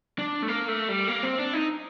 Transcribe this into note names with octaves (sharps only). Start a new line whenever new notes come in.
D4
A3
A#3
A3
G3
A#3
C4
D4
D#4